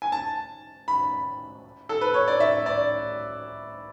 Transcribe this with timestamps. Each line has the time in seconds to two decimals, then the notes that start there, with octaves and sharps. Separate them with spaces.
0.02 G#5
0.12 A5
0.88 B5
1.89 A4
2.01 B4
2.14 C#5
2.28 D5
2.40 E5
2.66 D5